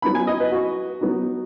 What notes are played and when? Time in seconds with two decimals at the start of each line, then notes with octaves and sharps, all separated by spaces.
0.02 F#3 B3 D#4 B5
0.15 G#5
0.27 D#5
0.40 B4
0.52 F#4
1.01 F#3 B3 D#4